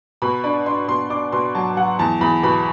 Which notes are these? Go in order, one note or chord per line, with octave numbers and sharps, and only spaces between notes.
B2 B5
D4 B5
D4 C6
B2 C6
D4 D6
B2 C6
F#3 A5
F#3 F#5
E2 A5
E2 B5
B2 B5